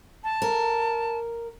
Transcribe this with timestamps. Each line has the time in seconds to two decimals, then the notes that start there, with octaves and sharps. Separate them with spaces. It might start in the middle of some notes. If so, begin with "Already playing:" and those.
0.24 A5
0.42 A#4